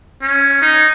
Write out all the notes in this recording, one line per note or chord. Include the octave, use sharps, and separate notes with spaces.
C#4
D#4